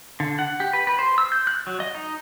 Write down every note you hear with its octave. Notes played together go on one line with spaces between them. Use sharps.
D3
F#5
G4
B4
B4
C5
E6
G6
F#6
F#3
D#5
D#4